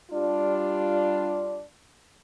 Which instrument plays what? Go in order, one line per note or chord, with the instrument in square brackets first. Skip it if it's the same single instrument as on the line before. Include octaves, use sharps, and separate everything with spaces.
[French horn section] G3 D4 F4